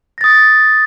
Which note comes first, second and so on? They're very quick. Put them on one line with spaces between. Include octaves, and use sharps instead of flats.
A#6 A6 D#6